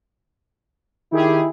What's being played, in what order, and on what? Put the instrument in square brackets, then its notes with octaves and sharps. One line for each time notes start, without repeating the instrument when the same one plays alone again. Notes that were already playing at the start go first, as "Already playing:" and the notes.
[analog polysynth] D#3 G4 G#4 [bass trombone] E4